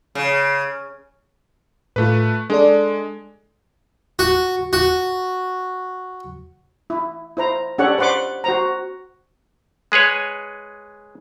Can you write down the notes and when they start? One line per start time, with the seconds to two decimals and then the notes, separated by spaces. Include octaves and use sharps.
0.15 C#3
1.96 A2 A3 F4 B4
2.50 G#3 D4 A4 D5
4.19 F#4
4.73 F#4
6.90 E4
7.37 E4 C5 A#5
7.78 C#4 D4 G4 A4 C#5 F#5
7.98 B4 C5 F#5 C6 D6
8.44 F#4 C5 A#5
9.92 G#3 G#4 B4 C#5